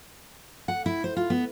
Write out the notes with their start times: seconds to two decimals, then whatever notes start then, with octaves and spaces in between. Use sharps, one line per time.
0.68 F#5
0.86 E4
1.04 C5
1.16 F4
1.30 B3